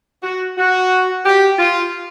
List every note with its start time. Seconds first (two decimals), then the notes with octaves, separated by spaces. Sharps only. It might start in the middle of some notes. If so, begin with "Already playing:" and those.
0.23 F#4
0.57 F#4
1.24 G4
1.58 F4